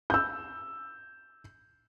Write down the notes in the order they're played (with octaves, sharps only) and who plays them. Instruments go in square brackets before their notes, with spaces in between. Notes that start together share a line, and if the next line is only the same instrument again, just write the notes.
[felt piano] E6 G6